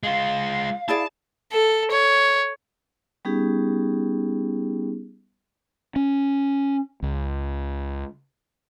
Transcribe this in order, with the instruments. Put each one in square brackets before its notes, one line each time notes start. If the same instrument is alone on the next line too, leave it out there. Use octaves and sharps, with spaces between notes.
[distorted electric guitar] G#3 F4 [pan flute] F5
[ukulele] E4 G#4 D5 [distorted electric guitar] A5
[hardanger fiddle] A4
C#5
[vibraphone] G3 B3 C#4 D#4 G4 G#4
[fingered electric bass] C#4
C#2